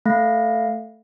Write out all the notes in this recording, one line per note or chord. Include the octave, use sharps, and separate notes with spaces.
A3 F5 A#6